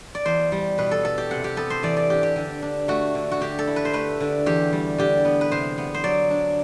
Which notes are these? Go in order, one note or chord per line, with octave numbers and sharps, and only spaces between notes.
D5
E2 C5
G3
B2 B4
A4
B3 A4
G4
C3 F#5
G4
B3 A4
C5
E3 D5
D5
D4 G4
G4
D3
D4
A3 F#4
D3
F#4
D3 G4
A4
E4
B4
C5
A3 B4
D3
E2 G4
G3
D3 G4
B3
B4
C3 C5
B3
C5
F#3 D5
D4